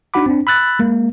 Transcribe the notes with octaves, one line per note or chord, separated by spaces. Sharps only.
D4 D#4 F#4 F#5 B5 D6
C4 D4
B5 E6 F#6 A6
G#3 A#3